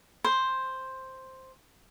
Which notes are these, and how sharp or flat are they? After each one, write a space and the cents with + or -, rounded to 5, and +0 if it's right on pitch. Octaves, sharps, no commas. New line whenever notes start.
C5 +5